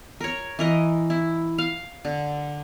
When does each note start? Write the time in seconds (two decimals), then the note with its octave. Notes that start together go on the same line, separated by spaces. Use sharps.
0.20 A#4 C#5
0.59 E3 A#4 D#5
1.10 E4
1.58 F5
2.05 D3